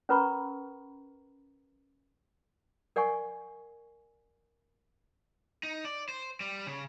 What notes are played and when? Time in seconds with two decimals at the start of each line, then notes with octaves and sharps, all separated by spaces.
0.09 C#4 A#4 B4 A#5 B5 C#6
2.96 A#4 D5 F#5 G#5 C#6
5.63 D#4
5.85 D5
6.09 C5
6.40 G3
6.67 C#3